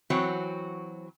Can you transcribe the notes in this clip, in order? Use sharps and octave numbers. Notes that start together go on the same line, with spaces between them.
E3 F#3 C4 F#4 C#5